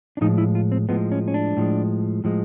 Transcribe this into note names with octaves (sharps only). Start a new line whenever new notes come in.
D4
A2 F3 G#3 D#4
E4
F4
C4
A2 F3 G#3 B3
C#4
C#4
D4
A2 F3 G#3
A2 F3 G#3